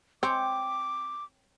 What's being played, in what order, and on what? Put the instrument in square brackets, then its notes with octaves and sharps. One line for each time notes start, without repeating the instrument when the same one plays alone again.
[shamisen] C4 [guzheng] C#5 G5 [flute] D6